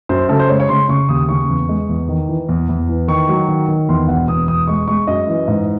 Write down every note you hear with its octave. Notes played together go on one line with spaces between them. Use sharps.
F#2 C5
C#3 A4
C5
G#3 C#5
C#5
C#3 C6
C#3 C#6
D#2 D#6
C#3 C#6
E2
G#3
E2
D#3
E3
E2
E2
E3
D#3 C#6
F#3
D#3
D#3
E2 C6
E1 F#5
E2 D#6
E1 D#6
G#3 C#6
G#3 C#6
F#2 D#5
E3
G#2